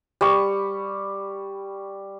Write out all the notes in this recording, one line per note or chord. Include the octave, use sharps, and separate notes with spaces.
G3 C#6